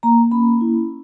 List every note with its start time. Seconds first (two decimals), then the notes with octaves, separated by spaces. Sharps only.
0.03 A#3 A#5
0.31 C#4 B5
0.61 E4